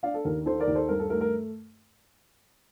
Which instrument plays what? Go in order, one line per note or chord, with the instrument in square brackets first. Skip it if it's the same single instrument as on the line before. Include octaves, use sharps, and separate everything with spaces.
[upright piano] D4 [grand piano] D5 F5
[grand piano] A4
[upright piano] D#2 [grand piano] A#4
[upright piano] D#3 [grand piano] A4 C5
[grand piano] A#4 D5
[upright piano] D#2
[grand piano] A4 C5
[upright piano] G2 [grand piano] A#4
[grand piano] A4
[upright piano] A3 [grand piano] A#4
[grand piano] A#4